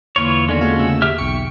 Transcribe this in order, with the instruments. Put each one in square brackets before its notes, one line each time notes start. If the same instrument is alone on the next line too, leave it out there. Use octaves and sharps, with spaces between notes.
[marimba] E2 D3 A#3 [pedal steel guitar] E3 F4 C#5
[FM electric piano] D3 [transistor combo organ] D#3 [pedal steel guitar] G#3 C#4 F#4 [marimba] B3
[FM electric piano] A#2 F4 [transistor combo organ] A3 A4 [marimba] G#4
[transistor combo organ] C#3 A3 E6
[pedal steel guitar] G4 E5 F6
[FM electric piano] B1 C#7 [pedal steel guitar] G5 [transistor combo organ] C#6